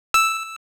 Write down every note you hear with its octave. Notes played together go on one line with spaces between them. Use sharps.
E6